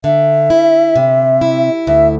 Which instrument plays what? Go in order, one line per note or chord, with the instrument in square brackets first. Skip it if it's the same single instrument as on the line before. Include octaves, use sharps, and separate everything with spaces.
[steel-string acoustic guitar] D3 [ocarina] E5
[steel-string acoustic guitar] E4
C3
E4
[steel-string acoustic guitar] D2 [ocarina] E5